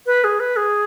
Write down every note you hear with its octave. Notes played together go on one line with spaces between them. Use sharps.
B4
G#4
B4
G#4